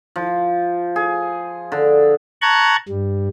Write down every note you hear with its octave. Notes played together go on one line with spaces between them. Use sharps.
F3
G#4
D3
A5 A#5 C#6 F#6 G#6
G2 G3